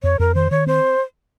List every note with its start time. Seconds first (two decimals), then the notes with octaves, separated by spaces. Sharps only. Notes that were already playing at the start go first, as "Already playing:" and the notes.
0.03 F2 C#5
0.19 F2 A#4
0.35 D#3 C5
0.51 D#3 C#5
0.67 C4 C5